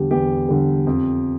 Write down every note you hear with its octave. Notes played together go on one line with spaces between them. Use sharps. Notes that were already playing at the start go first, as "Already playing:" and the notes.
Already playing: E2 D3 G3 G4
E2 G4
D3 G3
F2